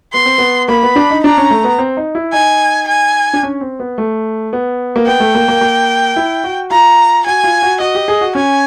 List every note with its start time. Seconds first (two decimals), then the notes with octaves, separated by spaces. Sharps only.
0.13 B3 C6
0.25 C4
0.38 B3
0.68 A#3 B5
0.83 B3
0.96 D4
1.10 D#4
1.23 D4 A#5
1.38 C#4
1.51 A3
1.64 B3
1.79 C4
1.97 D#4
2.15 E4
2.33 D#4 G#5
2.88 G#5
3.33 D4
3.43 C#4
3.61 C4
3.80 B3
3.98 A3
4.53 B3
4.96 A#3
5.07 B3 G5
5.20 A3
5.35 A#3
5.48 A#3
5.61 A#3
6.16 E4
6.44 F#4
6.71 F4 A#5
7.26 F#4 G#5
7.44 F4
7.63 F#4
7.80 F#4 D#5
7.95 G4
8.08 G#4
8.21 F#4
8.35 C#4 G#5